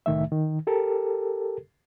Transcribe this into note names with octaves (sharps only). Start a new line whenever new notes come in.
C2 A2 D#3 A3 E5
D#3
G4 A4 A#4